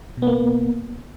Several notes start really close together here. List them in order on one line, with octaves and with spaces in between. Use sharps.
B2 B3 A#3